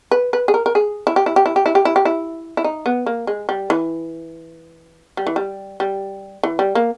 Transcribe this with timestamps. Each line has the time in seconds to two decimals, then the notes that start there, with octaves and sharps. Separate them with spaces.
0.11 B4
0.33 B4
0.48 G#4
0.54 A#4
0.66 A#4
0.75 G#4
1.07 E4
1.16 G4
1.26 E4
1.36 G4
1.46 E4
1.56 G4
1.66 E4
1.75 G4
1.85 E4
1.96 G4
2.05 E4
2.57 E4
2.64 D#4
2.86 B3
3.06 A#3
3.27 G#3
3.49 G3
3.70 E3
5.17 G3
5.27 E3
5.36 G3
5.80 G3
6.43 E3
6.59 G3
6.75 A#3